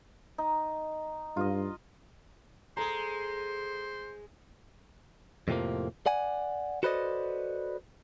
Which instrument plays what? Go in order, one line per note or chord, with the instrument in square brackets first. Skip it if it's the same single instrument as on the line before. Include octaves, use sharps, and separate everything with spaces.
[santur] D#4
[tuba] G2 [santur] F4 D#5
[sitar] G#3 G#4 [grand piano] A4 A#5 [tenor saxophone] C5
[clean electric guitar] F2 A2 C3 F3 A#3
D5 F#5 G#5
F#4 A4 B4 C5 D5 D#5